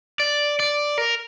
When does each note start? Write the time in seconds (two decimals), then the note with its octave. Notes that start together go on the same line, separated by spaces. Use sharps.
0.20 D5
0.60 D5
0.98 A#4